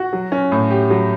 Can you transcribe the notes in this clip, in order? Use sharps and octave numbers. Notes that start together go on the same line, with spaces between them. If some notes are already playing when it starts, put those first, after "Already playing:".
Already playing: F#4
F#3
C#4
A2
G4
F#3